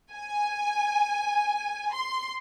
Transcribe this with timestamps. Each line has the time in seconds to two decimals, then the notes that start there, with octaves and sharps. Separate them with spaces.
0.14 G#5
1.94 C6